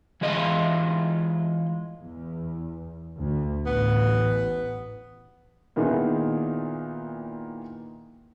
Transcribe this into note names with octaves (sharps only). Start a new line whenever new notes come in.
E3 G#3 F4 D#5
E2
D2
A1 B3
A#2 D#3 B3 D#4 E4 G#4